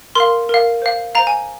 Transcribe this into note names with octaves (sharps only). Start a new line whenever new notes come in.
A#4 F5 C6
A#4 F5
C5 F5
C5 F5 A#5
G#5